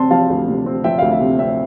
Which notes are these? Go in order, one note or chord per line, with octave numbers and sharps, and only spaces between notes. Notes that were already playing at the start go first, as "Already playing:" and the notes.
Already playing: C3 C4 A5 C6
F3 F5 A5
D2
C3
C4
F3 E5 G5
F5
D2
E5
C3
C4 E5 G5